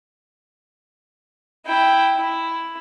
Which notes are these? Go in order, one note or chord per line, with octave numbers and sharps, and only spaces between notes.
E4 G5
E4